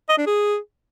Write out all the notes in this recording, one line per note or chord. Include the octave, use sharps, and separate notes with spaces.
D#5
D4
G#4